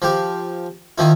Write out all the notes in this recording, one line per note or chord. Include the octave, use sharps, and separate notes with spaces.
F3 G4
D#3 F3 E4